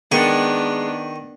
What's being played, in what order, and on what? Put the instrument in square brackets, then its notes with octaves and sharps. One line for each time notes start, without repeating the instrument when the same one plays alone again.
[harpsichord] D#3 C#6 [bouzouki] G#3 [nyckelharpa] B3 D4